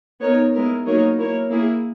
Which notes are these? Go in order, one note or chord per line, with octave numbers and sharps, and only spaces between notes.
B3 D#4 A#4 C#5
G#3 B3 E4 A#4
F#3 A#3 D#4 A#4 C#5
A#3 E4 A#4 C#5
A#3 E4 G#4